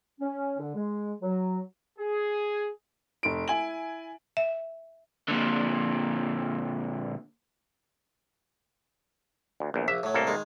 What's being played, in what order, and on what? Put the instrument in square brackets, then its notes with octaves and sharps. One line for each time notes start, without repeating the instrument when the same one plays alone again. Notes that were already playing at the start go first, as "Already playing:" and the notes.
[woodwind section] C#4
D3
G#3
F#3
[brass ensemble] G#4
[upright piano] F1 D7
E4 G#5 F#7
[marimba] E5
[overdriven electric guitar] A#2 D3
[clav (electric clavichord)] D2
A#1 E2
[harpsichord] A#1 [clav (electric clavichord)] E5
[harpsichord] A2 F#3
[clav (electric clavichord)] C2 A#3 A4
[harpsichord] D#3 G#3